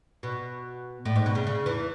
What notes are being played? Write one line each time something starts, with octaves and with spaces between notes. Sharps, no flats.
B2
A2
G#2
B2
C#3
C#3
E2 E3